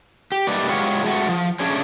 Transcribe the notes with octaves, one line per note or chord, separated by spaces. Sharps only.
G4
G3 A3 A#3 D#4 B4 D5
F#3 G#3 F4 G4 C#5
G#3 A3 F#4
F3
A3 C#4 D4 G#4 C#5